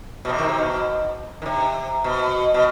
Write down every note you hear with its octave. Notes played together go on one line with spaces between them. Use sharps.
B2
C3
D#3
C3
B2
D#3
C3
B2
B2